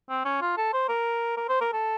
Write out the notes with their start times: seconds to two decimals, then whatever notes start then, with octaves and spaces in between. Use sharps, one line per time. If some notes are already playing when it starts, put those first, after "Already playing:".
0.10 C4
0.25 C#4
0.42 F4
0.57 A4
0.73 C5
0.89 A#4
1.37 A#4
1.49 C5
1.61 A#4
1.73 A4